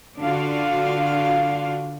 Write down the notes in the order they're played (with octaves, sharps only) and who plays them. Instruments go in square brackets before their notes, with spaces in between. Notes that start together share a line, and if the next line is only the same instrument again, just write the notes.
[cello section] D3 D4 F4 F#4 F5